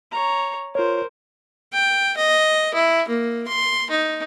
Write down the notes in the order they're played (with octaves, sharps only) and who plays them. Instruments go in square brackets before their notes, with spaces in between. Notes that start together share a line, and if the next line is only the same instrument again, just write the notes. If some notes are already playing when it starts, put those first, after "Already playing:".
[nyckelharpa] C#5 A#5
[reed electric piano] F4 C#5 [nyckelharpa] A#4 C5
[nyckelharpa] G5
D#5
E4
A#3
C6
D#4